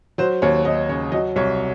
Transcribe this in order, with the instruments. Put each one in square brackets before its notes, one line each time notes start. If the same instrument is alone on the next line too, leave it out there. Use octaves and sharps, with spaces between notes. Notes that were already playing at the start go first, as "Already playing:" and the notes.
[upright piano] F#3 C5
D#2 C#5
D#2 D#5
C#3 C#5
F#3 D#5
C2 C#5